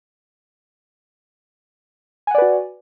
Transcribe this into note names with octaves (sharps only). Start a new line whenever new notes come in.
F#4 B4 D5 F#5 G#5